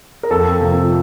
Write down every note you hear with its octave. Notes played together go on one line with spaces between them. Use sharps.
A#4
F2 A4
C3 F3